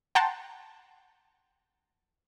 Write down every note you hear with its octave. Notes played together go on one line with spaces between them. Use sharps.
F#5 G5 A5 A#5 C6